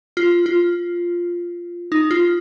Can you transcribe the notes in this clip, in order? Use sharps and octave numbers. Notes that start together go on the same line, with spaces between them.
F4
F4
D#4
F4